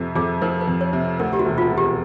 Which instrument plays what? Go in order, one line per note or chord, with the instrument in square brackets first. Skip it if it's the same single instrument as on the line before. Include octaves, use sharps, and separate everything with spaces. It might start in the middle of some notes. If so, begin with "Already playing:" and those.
Already playing: [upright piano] F2 C3
[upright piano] F2 [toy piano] G#4
[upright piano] F3 [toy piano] A#4
[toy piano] B4
[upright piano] F2
[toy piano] C#5
[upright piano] C3
[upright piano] D2 [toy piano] A#4
[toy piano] G4
F#4
[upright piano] E1
[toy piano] F4
[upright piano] E1
[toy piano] G4